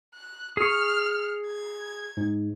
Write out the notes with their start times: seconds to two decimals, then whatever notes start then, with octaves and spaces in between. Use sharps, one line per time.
0.15 F#6
0.57 G#4 C#6 F6
1.46 G#6
2.17 G#2